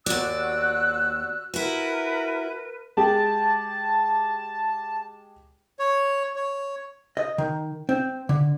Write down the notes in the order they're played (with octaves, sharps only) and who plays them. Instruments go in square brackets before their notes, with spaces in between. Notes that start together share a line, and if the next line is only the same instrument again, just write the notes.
[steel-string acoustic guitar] D#2 D5 [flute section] F#4 E6 F#6
[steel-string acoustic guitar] E4 F#4 [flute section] A#4 B4
[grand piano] G#3 G4 G#4 [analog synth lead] A5
[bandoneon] C#5
C#5
[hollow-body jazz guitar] D#5
D#3
C4
D3